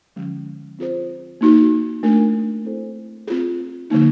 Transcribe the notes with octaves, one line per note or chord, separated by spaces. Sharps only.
D3 F3 G#3 C#4
C4 F4 G#4 C5
A#3 D#4 F#4
A3 D4 F4 A#4
C4 E4 A4 C5
C4 F4 G#4
D3 F3 A#3 D#4